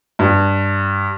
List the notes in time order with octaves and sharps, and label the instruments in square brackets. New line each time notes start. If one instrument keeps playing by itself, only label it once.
[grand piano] G2